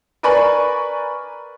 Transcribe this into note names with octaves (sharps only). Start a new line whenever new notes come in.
A#4 B4 D5 G#5 B5 C#6